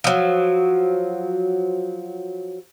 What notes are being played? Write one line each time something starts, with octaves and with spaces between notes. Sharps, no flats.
F3 F#3